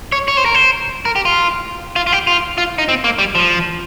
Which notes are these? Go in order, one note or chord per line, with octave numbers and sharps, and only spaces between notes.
C#5
C#5
C5
A#4
C5
A#4
G4
F4
F4
F4
G4
F4
F4
D#4
C4
A#3
G3
F3